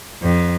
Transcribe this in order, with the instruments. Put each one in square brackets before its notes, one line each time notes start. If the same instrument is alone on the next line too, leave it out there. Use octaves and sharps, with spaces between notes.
[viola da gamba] F2